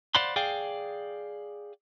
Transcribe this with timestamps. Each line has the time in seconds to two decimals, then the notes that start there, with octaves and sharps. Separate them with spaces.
0.15 C5 D5 F5 F#5 B5 C6
0.36 G#4 D5 F5 G5